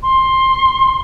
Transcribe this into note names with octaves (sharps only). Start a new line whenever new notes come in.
C6